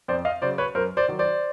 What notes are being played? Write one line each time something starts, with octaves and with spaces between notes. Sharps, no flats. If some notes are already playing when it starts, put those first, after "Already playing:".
F2 C5 D5
D#5 F5
C#3 F#3 C5 D5
B4 C#5
F#2 A#4 C5
C5 D5
D#3 F#3
C5 D5